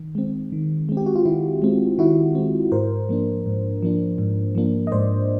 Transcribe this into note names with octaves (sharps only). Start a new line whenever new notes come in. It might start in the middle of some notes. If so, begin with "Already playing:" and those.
Already playing: D#3
G#3 C4
D#3
G#3 C4
G4
F#4
F4
D#3 E4
G#3 C4
D#3 E4 F#4
G#3 C4
G#2 A#4 C5
F3 A#3 D4
G#2
F3 A#3 D4
G#2
F3 A#3 D4
D#5
G#2 C5 D5